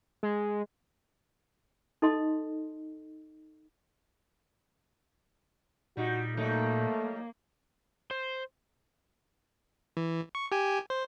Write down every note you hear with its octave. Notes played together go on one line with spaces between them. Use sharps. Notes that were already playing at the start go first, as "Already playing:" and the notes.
G#3
D#4 A4 D#5 C6
A#2 G3 D#4 F#4
F#3 G3 A3 A#3 D#4
C5
E3
C#6
G4 G#5
C5